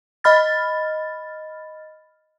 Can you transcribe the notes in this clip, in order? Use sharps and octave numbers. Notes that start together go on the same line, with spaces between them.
D#5 B5 F6 A6